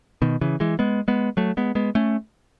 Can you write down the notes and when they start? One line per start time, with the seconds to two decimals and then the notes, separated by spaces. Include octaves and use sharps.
0.22 B2 D#3
0.41 C#3 E3
0.60 E3 G#3
0.79 G#3 B3
1.08 G#3 B3
1.37 F#3 A3
1.57 G#3 B3
1.75 G#3 B3
1.95 A3 C#4